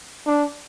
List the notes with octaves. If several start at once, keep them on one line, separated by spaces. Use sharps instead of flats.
D4